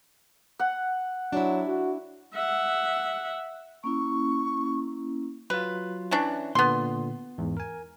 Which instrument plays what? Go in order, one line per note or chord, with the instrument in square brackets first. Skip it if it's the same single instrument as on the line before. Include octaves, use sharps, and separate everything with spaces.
[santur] F#5
[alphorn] F#3 [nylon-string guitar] D4 E4
[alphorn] F#4
[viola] E5 F#5
[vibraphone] A#3 C#4 E4 [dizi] C#6
[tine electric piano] F#3 F4 [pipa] B4
[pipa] E3 C#4 D4
[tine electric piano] A#2 D3 [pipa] B3 C6
[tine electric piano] E2 G#2
A#4 G#5